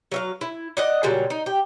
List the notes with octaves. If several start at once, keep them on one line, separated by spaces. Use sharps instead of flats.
F#3 E5 F5
E4
D5 D#5 F#5
A#2 C#3 F#3 G3
D#4
G4